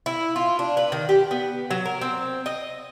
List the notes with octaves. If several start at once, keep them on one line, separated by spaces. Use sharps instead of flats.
E4
F4
D4
B4
D#3
G4
B3
F#3
A#4
C4
D#5